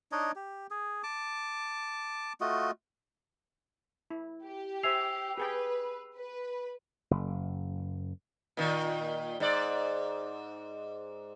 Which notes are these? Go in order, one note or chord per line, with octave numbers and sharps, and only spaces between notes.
D4 D#4 C#5 D#5
G4
G#4
A5 D6
A3 F4 F#4 D#5
E4
G4
C5 E5 G#5 E6 C7 F7
G4 G#4 B4 G5
B4
F#1
A#2 D#3
G#2 D5